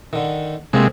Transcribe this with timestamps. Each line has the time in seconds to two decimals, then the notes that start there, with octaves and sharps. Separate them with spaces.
0.13 D3 D#3
0.73 C3 G#3 A#3 C4 A4